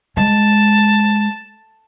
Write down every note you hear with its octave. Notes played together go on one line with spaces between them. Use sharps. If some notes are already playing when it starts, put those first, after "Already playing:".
G#3 A5